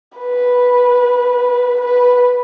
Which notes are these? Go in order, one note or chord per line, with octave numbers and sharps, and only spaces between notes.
B4
B4